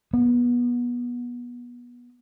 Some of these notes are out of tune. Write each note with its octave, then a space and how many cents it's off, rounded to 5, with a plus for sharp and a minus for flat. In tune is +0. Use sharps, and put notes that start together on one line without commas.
B3 -25